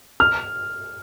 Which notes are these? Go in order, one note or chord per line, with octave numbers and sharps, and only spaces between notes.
F6